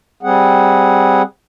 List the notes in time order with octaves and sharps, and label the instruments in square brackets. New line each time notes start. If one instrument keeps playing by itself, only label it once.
[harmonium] G3 C4 G#4 F#5